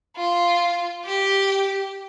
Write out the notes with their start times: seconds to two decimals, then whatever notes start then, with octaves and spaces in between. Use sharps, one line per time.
0.17 F4
1.05 G4